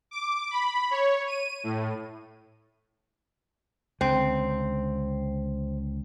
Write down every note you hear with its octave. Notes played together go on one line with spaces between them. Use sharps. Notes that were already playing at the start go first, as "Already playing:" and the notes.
D6
B5
C#5
D#7
A2
C#2 D3 C4